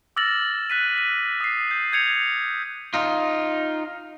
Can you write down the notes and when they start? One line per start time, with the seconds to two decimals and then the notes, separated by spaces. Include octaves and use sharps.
0.16 D6 E6 F6 A6 A#6 F#7
0.70 F#6 B6 D#7
0.98 D#7
1.40 D#6 C7
1.71 G6
1.93 G6 G#6 C#7 F7
2.94 D#4 F4